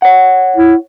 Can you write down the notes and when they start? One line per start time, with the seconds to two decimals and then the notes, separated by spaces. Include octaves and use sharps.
0.02 C#5 F#5
0.57 E4